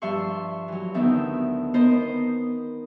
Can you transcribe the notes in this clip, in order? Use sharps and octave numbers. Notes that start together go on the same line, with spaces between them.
G2 F3 E5 C6 C#6
E3 F#3
D2 D#3 B3 C4 E5
B3 A#4 C5 D#5